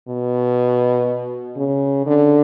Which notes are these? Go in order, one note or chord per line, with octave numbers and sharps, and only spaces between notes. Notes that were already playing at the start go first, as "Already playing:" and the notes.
B2
C#3
D3